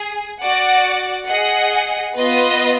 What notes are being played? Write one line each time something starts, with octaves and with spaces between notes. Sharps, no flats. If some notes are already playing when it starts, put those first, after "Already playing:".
Already playing: G#4
F#4 D5 F#5
G#4 D#5 F#5
B3 F4 B4 D#5